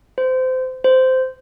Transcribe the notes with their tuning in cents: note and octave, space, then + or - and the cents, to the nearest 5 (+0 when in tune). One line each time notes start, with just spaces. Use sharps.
C5 -25
C5 -15